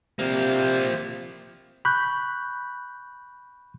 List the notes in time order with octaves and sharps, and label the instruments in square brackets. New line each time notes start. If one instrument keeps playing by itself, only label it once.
[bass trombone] C3 [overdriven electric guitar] F3 A#3
[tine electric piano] B5 C#6 F#6 G6